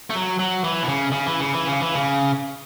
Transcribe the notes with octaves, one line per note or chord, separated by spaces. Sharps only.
A3
F#3
F#3
E3
B2
C#3
C#3
E3
C#3
E3
C#3
E3
C#3